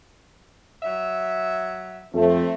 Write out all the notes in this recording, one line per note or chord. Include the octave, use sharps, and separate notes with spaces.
F#3 E5
F2 A3 C4